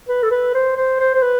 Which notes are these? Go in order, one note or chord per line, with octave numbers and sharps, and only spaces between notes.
B4
A4
B4
C5
C5
C5
C5
B4